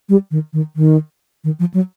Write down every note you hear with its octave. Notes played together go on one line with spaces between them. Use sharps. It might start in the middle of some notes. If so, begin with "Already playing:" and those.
G3
D#3
D#3
D#3
D#3
F3
F#3